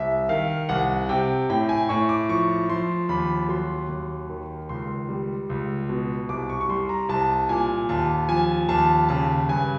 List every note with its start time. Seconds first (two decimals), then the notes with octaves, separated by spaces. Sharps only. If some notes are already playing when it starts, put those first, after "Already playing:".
Already playing: C2 E5
0.29 D#3 F5
0.69 C2 F#5
1.09 C3 G5
1.50 A2 G5
1.69 G#5
1.89 A2 C#6
2.09 D6
2.29 F3 C#6
2.69 F3 C6
3.09 D#2 B5
3.49 F#3 C6
3.89 D#2
4.30 D#3
4.69 C#2 C6
5.09 G3
5.49 C#2
5.89 B2
6.29 C2 D6
6.49 C#6
6.61 C#6
6.69 G3 C6
6.89 A#5
7.09 C2 A5
7.49 A#2 G#5
7.89 D#2 A5
8.29 F3 G#5
8.69 D#2 A5
9.09 C#3 A5
9.49 G2 G#5